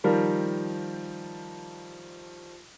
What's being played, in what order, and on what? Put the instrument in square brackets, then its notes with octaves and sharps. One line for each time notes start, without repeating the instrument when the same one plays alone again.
[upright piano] D#3 F3 G3 A#4